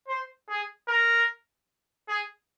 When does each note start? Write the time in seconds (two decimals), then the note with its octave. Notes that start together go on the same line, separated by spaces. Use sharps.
0.08 C5
0.49 G#4
0.88 A#4
2.08 G#4